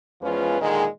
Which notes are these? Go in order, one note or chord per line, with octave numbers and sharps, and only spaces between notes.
E2 F3 G#3 C#4 F4 B4
A#2 D3 D#3 G#3